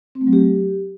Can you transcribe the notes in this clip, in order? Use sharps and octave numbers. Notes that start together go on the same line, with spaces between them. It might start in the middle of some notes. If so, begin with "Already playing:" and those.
C4
A3
F#3
G4